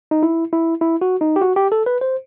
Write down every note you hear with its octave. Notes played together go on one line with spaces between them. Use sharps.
D#4
E4
E4
E4
F#4
D#4
G4
F#4
G4
A4
B4
C5